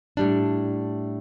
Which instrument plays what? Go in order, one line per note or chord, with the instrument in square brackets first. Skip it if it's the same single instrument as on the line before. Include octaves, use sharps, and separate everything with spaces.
[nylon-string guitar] A2 G3 D4